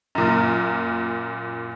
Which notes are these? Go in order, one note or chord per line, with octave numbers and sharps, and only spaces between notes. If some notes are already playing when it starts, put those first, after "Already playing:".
F#2 A#2